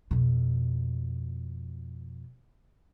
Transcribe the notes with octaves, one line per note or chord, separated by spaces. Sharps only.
F2 B2